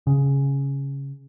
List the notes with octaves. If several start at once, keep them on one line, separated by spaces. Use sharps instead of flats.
C#3